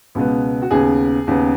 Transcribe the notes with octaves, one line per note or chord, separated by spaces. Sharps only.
C#2 B2 B3
F#4
D#2 C#3 B3 G#4
D#2 C#3 B3